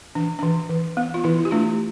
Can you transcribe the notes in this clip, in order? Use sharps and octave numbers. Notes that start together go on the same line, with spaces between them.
E3 D4
E3 D4
E3
B3
F4
E3 E4
E4
G4
A3 D4 F4